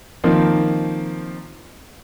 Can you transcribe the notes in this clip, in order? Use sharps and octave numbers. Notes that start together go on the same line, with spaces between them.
D#3 F3 A#3 C4